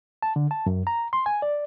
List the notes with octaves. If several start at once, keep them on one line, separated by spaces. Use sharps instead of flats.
A5
D3
A5
F#2
A#5
C6
G#5
D5